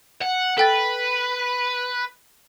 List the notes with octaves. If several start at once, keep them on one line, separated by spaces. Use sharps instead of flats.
F#5
A4 B4 G5 A6